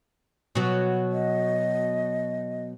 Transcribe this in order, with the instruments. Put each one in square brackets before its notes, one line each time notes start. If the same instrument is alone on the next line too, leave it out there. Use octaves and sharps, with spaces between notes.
[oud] B2 F#3
[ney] D#5